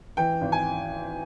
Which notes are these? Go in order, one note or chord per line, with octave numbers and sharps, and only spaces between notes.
E3 G5
G#1
G#5